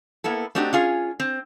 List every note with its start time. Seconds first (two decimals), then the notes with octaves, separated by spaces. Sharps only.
0.24 A#3 B3 E4 A4
0.55 A3 C4 D4 D#4 F#4 G4
0.73 C#4 F4 G#4
1.20 C4